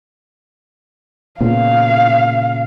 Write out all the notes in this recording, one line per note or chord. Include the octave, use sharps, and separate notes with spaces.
A#2 C#3 B3 F5